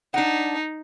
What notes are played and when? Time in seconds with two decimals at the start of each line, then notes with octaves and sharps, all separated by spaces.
0.14 D4 D#4 F#5